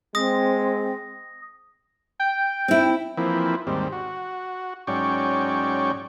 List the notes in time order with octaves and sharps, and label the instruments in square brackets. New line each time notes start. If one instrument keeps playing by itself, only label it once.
[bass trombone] G#3 [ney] C4 [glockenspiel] D#6 A#6
[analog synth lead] G5
[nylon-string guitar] C4 E4
[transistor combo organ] E3 F3 A#3 C4 E4
D#2 G#2 G3 C4
F#4
G#2 F#3 C#4 D5 G5 C#6